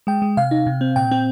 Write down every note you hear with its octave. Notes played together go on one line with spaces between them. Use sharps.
G#3 G5
G#3
C3 F5
D#4
C3
C4
A#2 G5
C4